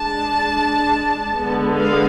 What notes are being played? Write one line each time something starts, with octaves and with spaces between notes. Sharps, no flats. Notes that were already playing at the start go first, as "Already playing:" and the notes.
Already playing: G#3 D4 A5
D3 G#3 B3
F5